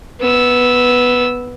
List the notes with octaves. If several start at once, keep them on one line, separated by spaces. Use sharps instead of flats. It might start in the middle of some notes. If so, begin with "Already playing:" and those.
B3 E6